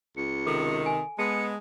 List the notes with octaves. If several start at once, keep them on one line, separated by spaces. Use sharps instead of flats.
C#2 C#7
C3 D#3 A4
G#5
G#3 B3 A5 C#7